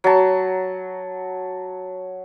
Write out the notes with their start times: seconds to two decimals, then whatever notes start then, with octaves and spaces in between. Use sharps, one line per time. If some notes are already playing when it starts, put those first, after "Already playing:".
0.04 F#3 A5